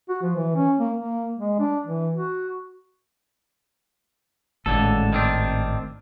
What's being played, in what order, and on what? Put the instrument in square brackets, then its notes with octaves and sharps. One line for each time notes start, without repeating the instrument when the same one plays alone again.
[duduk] F#4
F3
E3
C#4
A#3
A#3
G#3
D4
E3
F#4
[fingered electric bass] G#1 A2 [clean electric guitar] C#2 D3 A4
[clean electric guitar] D#3 C4 D4